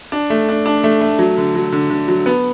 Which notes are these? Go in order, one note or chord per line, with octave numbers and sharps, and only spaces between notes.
D4
A3
D4
D4
A3
A3
F#3
D3
F#3
D3
D3
F#3
B3